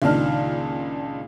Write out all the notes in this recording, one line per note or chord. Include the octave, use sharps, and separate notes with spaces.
C#2 A#2 D#3 D4 F6